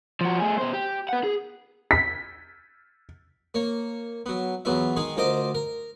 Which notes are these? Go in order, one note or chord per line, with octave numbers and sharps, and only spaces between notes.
F3 F#4
A3 G#4
B2 C5
G4
B4 F#5
G#4
B6
A#3 C#5
F#3 B3
E2 F#3 B3 F4 E5
D#3 G#3 D#4 G#4
D2 F4 A#4 C5 D#5 D6
A#4